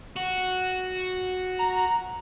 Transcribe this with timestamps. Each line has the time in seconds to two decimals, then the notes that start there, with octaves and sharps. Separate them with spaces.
0.16 F#4
1.59 A#5